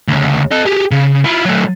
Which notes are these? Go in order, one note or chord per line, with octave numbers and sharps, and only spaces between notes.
D2 C#3
A4 D#5
G4 G#4
C#3
E4 F4
F#3 A3